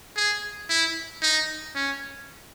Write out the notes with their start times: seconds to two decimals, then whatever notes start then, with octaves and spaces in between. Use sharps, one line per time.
0.17 G#4
0.69 E4
1.23 D#4
1.75 C#4